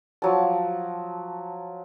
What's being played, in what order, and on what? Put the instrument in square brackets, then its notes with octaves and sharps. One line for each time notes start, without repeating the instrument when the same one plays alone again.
[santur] F3 F#3 A5